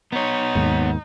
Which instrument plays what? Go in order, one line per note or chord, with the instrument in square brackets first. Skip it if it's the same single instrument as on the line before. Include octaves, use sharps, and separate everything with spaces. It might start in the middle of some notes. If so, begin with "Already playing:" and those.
[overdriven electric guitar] B3 C#5 [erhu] D#4
[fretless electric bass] D#2 G#2